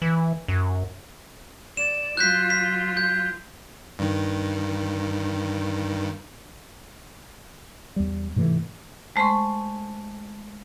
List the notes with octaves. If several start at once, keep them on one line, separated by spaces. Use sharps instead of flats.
E3
F#2
D5 E7
F#3 F4 F#6 G6 B6
B6
G6
G2 D#3
E2 G3
G#2 C3 E3 A3
G#3 A3 C5 C6 C#6